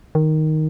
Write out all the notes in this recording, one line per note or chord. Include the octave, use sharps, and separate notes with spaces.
D#3